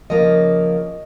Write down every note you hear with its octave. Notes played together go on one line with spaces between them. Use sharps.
C#3 F3 A#3 C#4 D#5